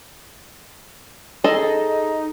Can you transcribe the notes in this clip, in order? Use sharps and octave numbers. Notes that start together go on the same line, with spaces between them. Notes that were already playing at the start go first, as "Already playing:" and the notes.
D#4 G#4 A4 D#5